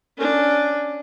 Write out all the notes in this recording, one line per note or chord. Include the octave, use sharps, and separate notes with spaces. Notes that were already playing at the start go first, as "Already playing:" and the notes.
C#4 D4